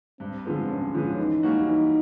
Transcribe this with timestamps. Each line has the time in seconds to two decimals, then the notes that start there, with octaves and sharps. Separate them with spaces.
0.20 G2 C4
0.45 D3 F3 G#3 B3
0.70 G2 C#4
0.94 D3 F3 G#3 B3
1.18 E3 D#4
1.43 G3 A#3 C#4 F#4
1.67 E3 D#4